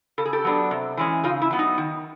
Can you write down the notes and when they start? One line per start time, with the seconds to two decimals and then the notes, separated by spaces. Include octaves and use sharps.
0.18 C#3 A4
0.25 G#4
0.33 G4 A4
0.44 F#3 B3 D4
0.71 C3
0.97 E3 G#3 C#4
1.24 C#3 D#4 F4
1.42 E4
1.51 F#3 B3
1.59 D#4
1.78 D#3